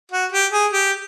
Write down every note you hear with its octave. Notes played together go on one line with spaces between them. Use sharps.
F#4
G4
G#4
G4